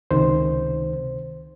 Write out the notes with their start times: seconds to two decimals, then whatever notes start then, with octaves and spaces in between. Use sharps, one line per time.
0.11 C#2 C3 D#3 C5